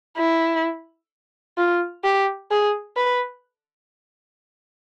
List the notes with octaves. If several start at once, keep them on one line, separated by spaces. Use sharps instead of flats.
E4
F4
G4
G#4
B4